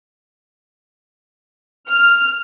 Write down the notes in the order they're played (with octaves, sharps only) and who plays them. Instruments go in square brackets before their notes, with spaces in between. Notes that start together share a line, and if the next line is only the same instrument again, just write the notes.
[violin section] F6